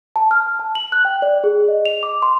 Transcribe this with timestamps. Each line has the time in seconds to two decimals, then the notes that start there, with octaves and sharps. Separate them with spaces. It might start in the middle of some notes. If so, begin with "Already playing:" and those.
0.16 A5
0.31 F6
0.59 A5
0.75 F#7
0.92 F#6
1.05 G5
1.22 D5
1.44 G#4
1.68 D#5
1.86 F7
2.03 D6
2.22 C6